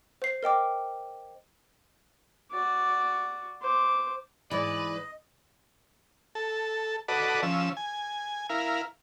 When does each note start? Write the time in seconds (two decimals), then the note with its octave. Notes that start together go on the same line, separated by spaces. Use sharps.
0.22 C5 C7
0.43 A#4 D#5 G5 D6
2.51 F#4 D5
3.62 C5 D6
4.51 G#2 E3 B4 D5 D#5
6.35 A4
7.08 F#4 A4 B4 D5 D#5
7.43 F3 C#4 E6
7.77 G#5
8.50 E4 A#4 F5